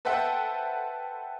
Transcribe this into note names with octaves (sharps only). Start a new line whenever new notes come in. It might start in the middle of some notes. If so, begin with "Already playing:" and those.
A4 B4 C5 E5 F#5 G5